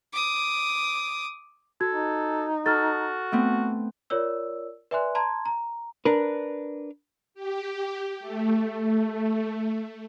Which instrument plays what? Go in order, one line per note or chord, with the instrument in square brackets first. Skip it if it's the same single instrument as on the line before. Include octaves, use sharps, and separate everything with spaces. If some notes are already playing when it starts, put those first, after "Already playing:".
[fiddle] D6 D#6
[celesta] F#4 G#6 [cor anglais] A4
[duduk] D#4
[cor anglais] F#4 [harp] A4 [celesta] F6 A6
[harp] A3 B3 C4
[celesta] F4 A#4 C#5 D5 E6
B4 D5 E5 G#5 C6 F#6
A5 A#5 C6 G#6
A#5
[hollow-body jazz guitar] D4 A#4 B4
[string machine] G4
A3